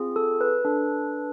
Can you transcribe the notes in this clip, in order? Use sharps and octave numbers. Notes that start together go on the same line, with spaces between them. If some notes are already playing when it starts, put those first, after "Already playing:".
Already playing: C4 F4 G#4
A4
B4
D4 A4